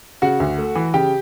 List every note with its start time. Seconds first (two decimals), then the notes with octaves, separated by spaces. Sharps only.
0.22 C#3 F#4 F#5
0.40 D2
0.58 A3
0.75 E3
0.94 C#3 G4 G5